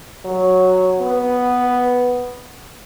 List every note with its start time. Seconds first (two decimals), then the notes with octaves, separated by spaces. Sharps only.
0.25 F#3
0.99 B3